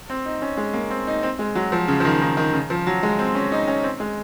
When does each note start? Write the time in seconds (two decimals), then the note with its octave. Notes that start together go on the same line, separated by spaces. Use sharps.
0.10 C4
0.26 D#4
0.42 C#4
0.57 G#3
0.74 A#3
0.90 C4
1.07 D#4
1.23 C4
1.39 G#3
1.55 F#3
1.72 F3
1.88 C#3
2.00 F3
2.05 D#3
2.21 D#3
2.37 D#3
2.53 C#3
2.70 F3
2.87 F#3
3.03 G#3
3.19 C4
3.35 C#4
3.52 D#4
3.68 C#4
3.83 C4
4.00 G#3